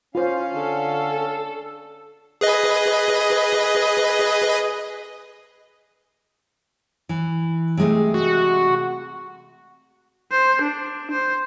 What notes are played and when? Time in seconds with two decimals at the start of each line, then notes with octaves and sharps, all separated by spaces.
0.15 C#4 F4 C5 F5
0.54 D3 A4
2.41 G#4 B4 D#5
7.09 E3
7.77 C3 G#3 A3
8.14 F#4
10.32 C5
10.62 D4
11.11 C5